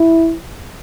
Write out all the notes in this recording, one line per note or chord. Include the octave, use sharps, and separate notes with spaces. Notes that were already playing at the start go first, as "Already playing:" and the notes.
Already playing: E4